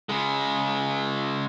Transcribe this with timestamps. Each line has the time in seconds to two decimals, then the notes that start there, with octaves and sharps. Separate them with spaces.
0.09 C#3 G#3